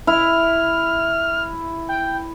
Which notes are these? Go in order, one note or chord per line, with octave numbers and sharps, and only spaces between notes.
E4 F6
G5